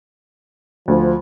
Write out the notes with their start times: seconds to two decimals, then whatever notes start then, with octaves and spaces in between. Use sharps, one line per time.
0.88 D2 F3